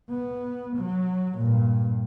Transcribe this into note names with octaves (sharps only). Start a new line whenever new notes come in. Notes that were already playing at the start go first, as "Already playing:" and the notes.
B3
F#3
G2 A#2